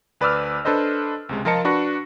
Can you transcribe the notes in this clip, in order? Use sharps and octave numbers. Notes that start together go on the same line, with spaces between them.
D2 B4 D5 D6 E6 F6
D4 A4 B4 C5 D#5
C#2 C3 G#3
F3 F4 A#4 D#5 A5 C#7
D4 F#4 B4 C#6 A#6